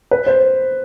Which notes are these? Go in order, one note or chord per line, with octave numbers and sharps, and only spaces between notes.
B4
C5